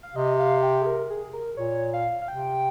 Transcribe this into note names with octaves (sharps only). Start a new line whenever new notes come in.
F5
C3 D#5
F5
G5
G#4
A#4
G#4
A#4
A#2 C#5
F5
F5
C3 G5